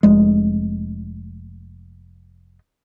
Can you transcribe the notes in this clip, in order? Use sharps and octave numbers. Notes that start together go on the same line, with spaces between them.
F1 G#3